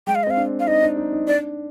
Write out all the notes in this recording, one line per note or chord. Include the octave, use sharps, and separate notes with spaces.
G#3 G5
F5
D#5
C4 F5
D4
F5
D#4 D#5
D4
D#4
D#4
D4 D5